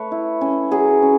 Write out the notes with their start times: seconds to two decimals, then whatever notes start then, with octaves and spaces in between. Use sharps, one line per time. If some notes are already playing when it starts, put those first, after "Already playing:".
Already playing: A3 B4 C#5
0.12 E4
0.41 C#4
0.71 F#3 G#4
1.02 C#4